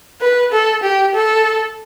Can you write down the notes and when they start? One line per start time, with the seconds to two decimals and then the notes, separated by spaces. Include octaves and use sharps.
0.21 B4
0.52 A4
0.83 G4
1.15 A4